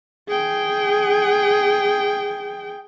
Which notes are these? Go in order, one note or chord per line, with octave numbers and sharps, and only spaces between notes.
G#4 G5